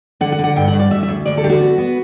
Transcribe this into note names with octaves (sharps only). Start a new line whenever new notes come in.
D3 F#5
F#5
D3
F#5
G2 G5
F#5
G2
D5
D2 E5
E5
D2
D2 D5
A4
D3 G4
F#4
B3
B3